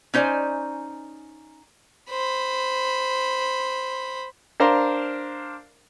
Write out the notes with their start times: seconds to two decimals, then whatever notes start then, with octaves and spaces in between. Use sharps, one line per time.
0.14 C#4 D#4 C5 D5 G#5
2.11 C5 B5
4.60 D4 A#4 C5 F5 A#5 C6